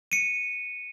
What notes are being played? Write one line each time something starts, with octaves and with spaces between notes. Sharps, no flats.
C#7 D#7